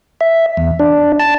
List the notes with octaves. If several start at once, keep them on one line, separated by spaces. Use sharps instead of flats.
E5
E2
D4
A5